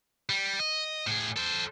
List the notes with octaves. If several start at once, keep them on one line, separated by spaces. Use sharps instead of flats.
G3
D#5
A2 G#4
A4 C5